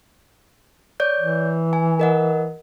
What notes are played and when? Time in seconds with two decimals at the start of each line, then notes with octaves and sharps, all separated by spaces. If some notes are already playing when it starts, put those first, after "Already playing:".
1.00 C#5 D5 G6
1.20 E3
1.73 G#5
1.99 A#4 D#5 F#5